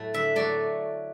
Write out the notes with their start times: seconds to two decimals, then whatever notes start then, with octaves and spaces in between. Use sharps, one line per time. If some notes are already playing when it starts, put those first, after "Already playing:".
Already playing: A2 F#3 A3
0.14 D3 E5
0.36 F#3 A3 D5